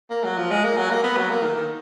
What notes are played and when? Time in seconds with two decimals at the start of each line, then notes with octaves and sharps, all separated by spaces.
0.10 A#3
0.24 F#3
0.38 F3
0.51 G#3
0.64 A#3
0.77 F#3
0.91 A#3
1.03 B3
1.17 F#3
1.30 A#3
1.43 D#3
1.56 D#3